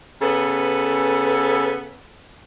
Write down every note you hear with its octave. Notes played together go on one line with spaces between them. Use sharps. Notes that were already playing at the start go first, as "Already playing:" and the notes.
C#3 B3 A4 B4